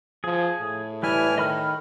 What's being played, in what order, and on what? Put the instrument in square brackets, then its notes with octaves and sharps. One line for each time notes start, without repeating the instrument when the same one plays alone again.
[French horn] F3 [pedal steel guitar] G#4
[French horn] A2
[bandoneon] E3 G#5 F6 [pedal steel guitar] G3 E4
[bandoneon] D#3 [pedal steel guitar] D#5 B5 F6